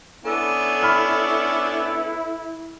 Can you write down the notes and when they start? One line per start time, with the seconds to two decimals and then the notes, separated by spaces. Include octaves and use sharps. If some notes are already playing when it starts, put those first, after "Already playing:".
0.25 B3 C#4 D4 E4 A4
0.83 B5 F6